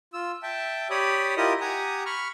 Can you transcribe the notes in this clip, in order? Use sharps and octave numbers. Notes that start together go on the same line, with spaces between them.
F4 E6
E5 G5 A5
G4 C#5 D5 B5 D#6
E4 F4 G4 A#4 D#5 D#6
G4 F#5 G#5 A#5 D#6
B5 C#6 F6